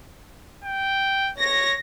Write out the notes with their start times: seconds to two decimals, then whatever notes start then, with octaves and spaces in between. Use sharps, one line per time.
0.64 G5
1.38 C#5 A#6